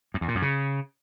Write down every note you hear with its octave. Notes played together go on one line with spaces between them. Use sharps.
F#2
E2
A#2
F#2
C#3